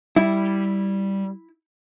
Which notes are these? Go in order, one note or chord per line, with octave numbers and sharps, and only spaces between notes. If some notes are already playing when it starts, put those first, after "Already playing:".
G3 E4